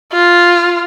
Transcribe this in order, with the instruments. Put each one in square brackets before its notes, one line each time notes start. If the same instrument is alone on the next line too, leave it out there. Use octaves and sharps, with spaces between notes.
[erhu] F4